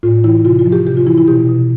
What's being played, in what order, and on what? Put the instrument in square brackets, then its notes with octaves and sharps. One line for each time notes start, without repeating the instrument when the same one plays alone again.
[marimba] A2 F4
E3 E4
C3 F4
F4
F3
G4
C3 G4
F4
E3 E4
E4
B2 G4
B2